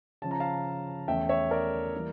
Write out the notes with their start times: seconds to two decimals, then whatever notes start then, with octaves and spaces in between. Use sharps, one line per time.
0.22 C#3 F3 C#4 A5
0.31 A#5
0.40 F5 A5
1.08 E2 E3 A3 C#4 E5 G5
1.29 C#5 E5
1.51 A#4 D5
1.94 E3 G3 A#3